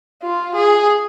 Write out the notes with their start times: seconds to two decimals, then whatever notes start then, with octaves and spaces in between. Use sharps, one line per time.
0.23 F4
0.55 G#4